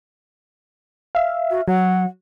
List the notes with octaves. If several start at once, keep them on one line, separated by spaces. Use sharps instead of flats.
E5 F5
F#4
F#3 F#5